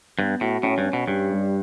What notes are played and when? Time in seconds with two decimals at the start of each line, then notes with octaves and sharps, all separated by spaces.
0.19 G2 B3
0.41 A2 F#4
0.63 A2 C#4
0.78 G2
0.86 C#4
0.93 B2
1.07 G2 G4
1.31 G3